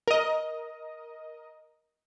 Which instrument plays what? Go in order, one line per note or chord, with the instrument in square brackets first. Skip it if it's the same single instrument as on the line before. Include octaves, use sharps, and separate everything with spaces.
[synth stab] A#4 D#5